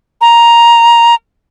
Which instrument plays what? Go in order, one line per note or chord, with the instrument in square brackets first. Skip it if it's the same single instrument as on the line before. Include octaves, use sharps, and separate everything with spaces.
[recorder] A#5